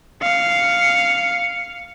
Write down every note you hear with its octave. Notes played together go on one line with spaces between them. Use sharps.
F5 C#7